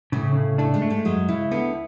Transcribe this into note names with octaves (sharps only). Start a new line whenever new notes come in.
A2 C#3 A3
C#3
A2 A3 D4
G#2 G#3
A3
G#2 G#3
F#2 F#3 G#3
C#3 E4
D2 D3 B3